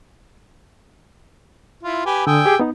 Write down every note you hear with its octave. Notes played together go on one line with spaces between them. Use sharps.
E4 F4
G4 B4 G#5
D3 G5 G#5 D#6 E6
G4 G#4 D6
B3 D#4